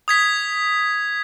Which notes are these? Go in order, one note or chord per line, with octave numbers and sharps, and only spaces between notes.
D#6 G#6 B6